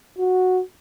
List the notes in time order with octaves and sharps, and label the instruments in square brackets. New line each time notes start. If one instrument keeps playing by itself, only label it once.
[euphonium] F#4